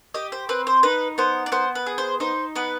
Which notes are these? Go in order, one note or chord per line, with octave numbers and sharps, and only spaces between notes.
G4 D#5
C5
C4 B4
C5
D#4 B4
B3 C5
D5
B3 C5
B4
G#4
C5
D#4 C5
B3 B4